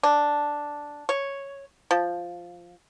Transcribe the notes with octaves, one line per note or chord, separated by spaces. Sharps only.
D4
C#5
F3